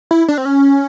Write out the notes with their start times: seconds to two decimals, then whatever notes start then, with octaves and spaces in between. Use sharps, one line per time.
0.11 E4
0.28 D4
0.38 C4
0.45 C#4